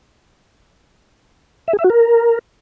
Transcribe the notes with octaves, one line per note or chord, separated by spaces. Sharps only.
E5
G#4
E5
F#4
A#4